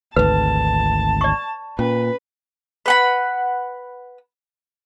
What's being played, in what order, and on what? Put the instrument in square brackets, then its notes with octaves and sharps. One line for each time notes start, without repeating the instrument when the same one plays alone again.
[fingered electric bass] G#1 D2 [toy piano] B4 [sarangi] A5
[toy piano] D5 C#6
[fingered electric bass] A#2 [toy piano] C#4 [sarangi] B4
[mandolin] B4 F#5 B5